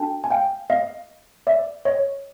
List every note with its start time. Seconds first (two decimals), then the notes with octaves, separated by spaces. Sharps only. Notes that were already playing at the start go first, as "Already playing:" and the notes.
Already playing: D4 F#4 A4 G5 A5
0.24 G#5
0.30 F5 G5
0.70 D#5 F5
1.47 D5 E5
1.85 C#5 D#5